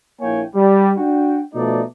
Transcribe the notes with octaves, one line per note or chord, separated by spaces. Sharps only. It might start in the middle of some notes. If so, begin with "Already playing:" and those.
A#1 A#3 E4 C#5 G5 G#5
G3
D4 F#4 G5
B2 F3 A3 D#4 D5